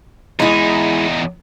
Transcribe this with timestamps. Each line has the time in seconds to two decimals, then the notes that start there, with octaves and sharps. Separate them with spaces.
0.40 E2 G#3 D#4 E4